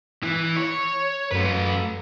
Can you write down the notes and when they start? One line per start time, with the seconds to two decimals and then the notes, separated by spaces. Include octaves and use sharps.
0.23 E3
0.56 C#5
1.31 F#2 A3 B4